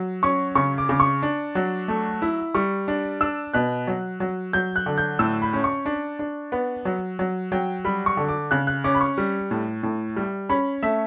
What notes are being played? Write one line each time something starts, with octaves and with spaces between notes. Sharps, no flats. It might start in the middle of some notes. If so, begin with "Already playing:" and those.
Already playing: F#3
C#4 C#6
C#3 C#6
D6
C#3 D6
C#6
D4
F#3
A3
E4
G3 C#6
D4
D4 E6
B2 F#6
F#3
F#3
F#3 G6
F#6
D3
G6
A2 E6
B5
C#4
C#6
D4
D4
B3
F#3
F#3
F#3 G5
G3 B5
C#6
D3
D6
C#3 F#6
F#6
C#4 D6
B5
C#6
G3
A2
A2
G3
C#4 B5
A3 E5